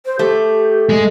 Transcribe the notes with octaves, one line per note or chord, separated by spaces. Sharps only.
C5
A3 G4
G#3 D#5